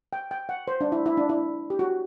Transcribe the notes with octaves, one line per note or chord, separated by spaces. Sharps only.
G5
G5
F#5
C5
D4
E4
E4
D4
E4
G4
F#4